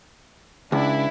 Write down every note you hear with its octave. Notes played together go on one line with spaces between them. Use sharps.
C#2 D4 E4